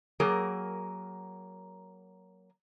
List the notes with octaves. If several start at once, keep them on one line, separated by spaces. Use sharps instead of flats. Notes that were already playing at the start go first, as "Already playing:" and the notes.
F#3 A#3 G#4 A#4